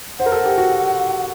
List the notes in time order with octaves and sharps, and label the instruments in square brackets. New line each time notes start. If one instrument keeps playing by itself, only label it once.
[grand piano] C5 [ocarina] F#5
[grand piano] A#4
A4
G4
F#4